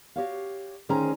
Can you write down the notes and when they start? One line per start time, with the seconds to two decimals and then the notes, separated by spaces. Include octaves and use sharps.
0.16 F#4 G4 C#5 F5
0.89 D2 D#3 C#4 G#4 C5 A#5